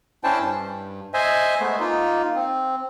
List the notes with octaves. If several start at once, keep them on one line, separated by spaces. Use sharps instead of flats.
C#4 D4 E4 C5 G5 A5
G2
C5 D#5 E5 G#5
G#3 A3 B3
A#3 D#4 F4
C4